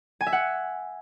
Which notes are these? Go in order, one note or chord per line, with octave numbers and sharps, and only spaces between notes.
G#5
E5
F#5